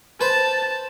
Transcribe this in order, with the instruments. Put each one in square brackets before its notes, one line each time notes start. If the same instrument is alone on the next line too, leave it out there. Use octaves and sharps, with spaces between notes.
[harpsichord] B4 C5 [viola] A5